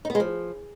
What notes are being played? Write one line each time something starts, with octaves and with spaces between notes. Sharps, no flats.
D#4
B3
G#3
F3